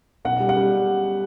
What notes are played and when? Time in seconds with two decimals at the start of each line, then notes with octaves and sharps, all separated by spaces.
0.25 B1 F#5
0.40 G3
0.49 F#5
0.57 G3